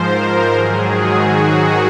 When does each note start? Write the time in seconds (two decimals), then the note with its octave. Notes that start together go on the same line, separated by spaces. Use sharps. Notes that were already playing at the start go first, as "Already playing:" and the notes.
Already playing: G#2 F3 A#4 C5
0.49 G#2 D#3 F#3 G#4
1.05 F#4